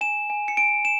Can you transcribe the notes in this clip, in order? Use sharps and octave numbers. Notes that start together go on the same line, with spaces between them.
G#5 E7
G#5
C#7
G#5 D7
E7